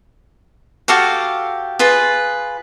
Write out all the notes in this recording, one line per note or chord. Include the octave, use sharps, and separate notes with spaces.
F#4 G4 A4 F5
F4 G#4 B4